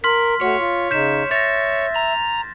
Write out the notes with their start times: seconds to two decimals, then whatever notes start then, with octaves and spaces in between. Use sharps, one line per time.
0.04 A#4 C6 F6 B6
0.41 A3 F#4 C#5
0.59 F4
0.91 C#3 D#4 G6 B6 E7
1.31 C#5 E5 A6 A#6
1.96 A#5